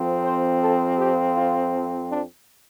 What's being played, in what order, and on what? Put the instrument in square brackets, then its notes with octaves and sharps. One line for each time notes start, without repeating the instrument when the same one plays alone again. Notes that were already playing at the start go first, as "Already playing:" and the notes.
Already playing: [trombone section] F2 F3 C4
C5
A4
G4
F4
D4